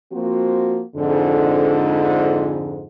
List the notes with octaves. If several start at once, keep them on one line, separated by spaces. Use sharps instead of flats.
F3 A#3 C4 F#4
F2 G#2 D3